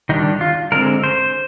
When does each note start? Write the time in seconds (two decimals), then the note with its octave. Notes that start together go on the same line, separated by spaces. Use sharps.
0.09 D#3 G3 D4 D#4
0.41 F4
0.72 D3 G#3 C4 A#4
1.04 C5